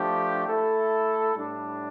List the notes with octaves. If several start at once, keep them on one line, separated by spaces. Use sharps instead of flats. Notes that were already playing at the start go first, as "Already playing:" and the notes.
Already playing: F3 A3 D4 G4
A3 E4 A4
A2 G3 D4